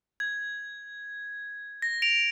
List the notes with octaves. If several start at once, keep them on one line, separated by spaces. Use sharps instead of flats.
G#6
A#6
D7 F7